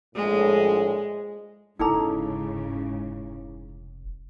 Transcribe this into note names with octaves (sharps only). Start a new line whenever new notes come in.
A#1 A2 G#3
F1 G#2 C#3 D#4 E4 A4 A#5 D6